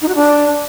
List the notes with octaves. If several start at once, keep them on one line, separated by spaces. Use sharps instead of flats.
D#4
F#4
D4